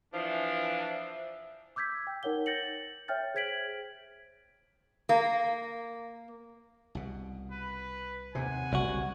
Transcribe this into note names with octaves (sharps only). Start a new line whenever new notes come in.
E3 F3 D4 C5 E5 E6
D6 E6 G6 G#6 B6
G5
D#4 A#4 C#5 F#5 G7
G6 A6 A#6 C#7 F#7
C#5 E5 G5 F6 G6 A6
G#4 C5 G#6 B6 D7 F#7
A#3
C2 B2
B4
D#2 A2 C3 F#5 G#5
F#1 C2 F#4